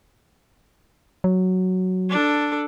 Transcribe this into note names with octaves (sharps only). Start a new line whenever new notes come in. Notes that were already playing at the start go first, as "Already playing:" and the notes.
F#3
D4 A4